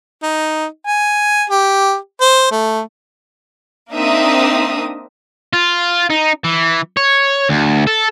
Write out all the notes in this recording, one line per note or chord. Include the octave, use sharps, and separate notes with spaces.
D#4
G#5
G4
C5
A3
A#3 C4 D4 D#4 E5 D#6
F4
D#4
E3
C#5
D2
A4